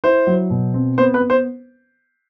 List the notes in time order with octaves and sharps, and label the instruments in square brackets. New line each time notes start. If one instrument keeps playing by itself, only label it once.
[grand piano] E4 [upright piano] C5
[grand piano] F#3
B2
C4
[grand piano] B3 [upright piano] C5
[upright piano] B4
[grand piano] B3
[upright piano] C5